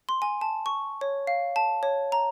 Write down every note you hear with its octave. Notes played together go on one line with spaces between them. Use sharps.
C6
G#5
A5
C#6
C#5
F5
A5
C#5
A#5